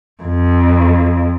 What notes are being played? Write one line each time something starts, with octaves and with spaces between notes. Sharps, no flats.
F2